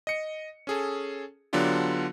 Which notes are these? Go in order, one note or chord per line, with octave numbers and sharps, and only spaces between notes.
D#5 C#7
C#4 G#4 A4
D3 F#3 B3 D4 F4 G4